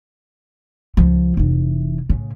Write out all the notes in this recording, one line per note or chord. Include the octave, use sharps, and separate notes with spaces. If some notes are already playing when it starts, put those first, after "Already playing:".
C#2 F3
F1 E3
A2 C#3